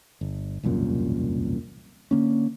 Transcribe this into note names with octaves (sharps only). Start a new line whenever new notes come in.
G1
E1 C2 F#2 A#2
D3 A#3 C#4